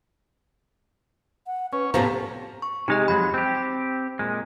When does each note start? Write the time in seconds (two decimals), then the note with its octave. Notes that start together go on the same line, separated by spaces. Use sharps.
1.47 F#5
1.73 C#4 B4
1.94 A2 C3 F3 B3 C#4 A#5
2.62 C#6
2.88 C3 G#3 D#4 G4 D#5
3.08 F2 F#3 G#3 B5
3.34 C4 G4
4.19 A#2 G#3